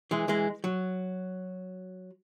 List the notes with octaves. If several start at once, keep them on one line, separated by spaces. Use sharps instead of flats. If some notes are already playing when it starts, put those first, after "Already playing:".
E3 G#3
E3 G#3
F#3